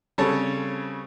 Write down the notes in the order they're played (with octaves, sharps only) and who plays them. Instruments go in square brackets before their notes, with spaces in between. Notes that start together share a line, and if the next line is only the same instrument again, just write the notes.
[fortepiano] C#3 G3 C4 A4 C#5